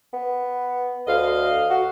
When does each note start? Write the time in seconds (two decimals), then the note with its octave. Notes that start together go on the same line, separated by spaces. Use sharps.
0.14 B3
1.07 D2 D#5 F5
1.70 F#4